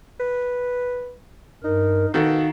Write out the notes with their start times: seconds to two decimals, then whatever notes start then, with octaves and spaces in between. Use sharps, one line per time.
0.20 B4
1.64 G2 D#4 A#4
2.14 B2 D#3 D#4 F#4 A4 F5